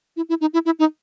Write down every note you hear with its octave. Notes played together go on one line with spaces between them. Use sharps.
E4
E4
D#4
E4
E4
D#4